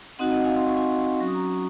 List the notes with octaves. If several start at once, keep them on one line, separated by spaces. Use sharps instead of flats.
C4 D#4 F#4 D#5 F#5
D#5 F#5
F5 G#5
C6
C#6
G#5 C6
F#3 C#4 F#4 C#6
D#6
A#5 C#6